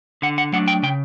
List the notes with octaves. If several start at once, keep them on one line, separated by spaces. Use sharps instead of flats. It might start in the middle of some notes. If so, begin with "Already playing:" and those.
D3 F#5
F#5
F#3 A3 D4 F#5
G5
C#3 G5